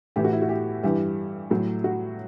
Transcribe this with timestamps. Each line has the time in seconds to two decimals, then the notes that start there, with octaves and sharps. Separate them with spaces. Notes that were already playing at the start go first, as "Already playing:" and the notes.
0.16 A2 E3 G4
0.24 F#4
0.33 E4
0.42 F#4
0.49 G4
0.83 G2 E3 G4
1.50 A2 F#3
1.84 F#4